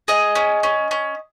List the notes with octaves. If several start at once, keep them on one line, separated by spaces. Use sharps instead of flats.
G#4 D#5
C#4
C#4
C#4